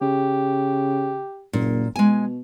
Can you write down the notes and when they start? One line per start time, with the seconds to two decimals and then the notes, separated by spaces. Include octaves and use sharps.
0.01 C#3 G4
1.53 F#1 A#2
1.96 B2 G#3 G#5